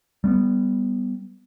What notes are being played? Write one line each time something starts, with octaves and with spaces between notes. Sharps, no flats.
G3 A#3 B3